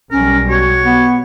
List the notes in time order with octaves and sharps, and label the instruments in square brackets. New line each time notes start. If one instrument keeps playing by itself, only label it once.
[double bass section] B1 G3 [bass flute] C#4 [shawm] A#4
[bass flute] F#4 [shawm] C#5
[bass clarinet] B3